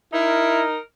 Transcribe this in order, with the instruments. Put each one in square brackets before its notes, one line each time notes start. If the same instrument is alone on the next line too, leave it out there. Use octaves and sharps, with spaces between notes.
[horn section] D#4 A#4 [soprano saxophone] E4